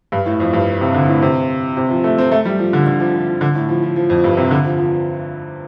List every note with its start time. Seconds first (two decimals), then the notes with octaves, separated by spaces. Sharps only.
0.12 G2
0.26 A2
0.40 F2
0.53 G2
0.81 C3
0.94 D3
1.09 A2
1.22 C3
1.77 C3
1.90 F3
2.04 A3
2.18 C4
2.32 A3
2.45 G3
2.59 F3
2.73 D3
2.86 D3
3.00 F3
3.14 F3
3.27 F3
3.41 D3
3.55 A2
3.69 F3
3.83 F3
3.96 F3
4.10 F2
4.24 G2
4.37 C3
4.51 D3
4.65 F3
4.78 F3